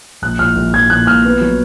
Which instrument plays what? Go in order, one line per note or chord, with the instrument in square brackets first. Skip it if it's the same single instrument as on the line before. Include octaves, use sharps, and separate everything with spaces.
[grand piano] A#1 F#6
A#1 F6
A#1
A#1 G#6
A#2 F#6
A#1 F6
B3
F#3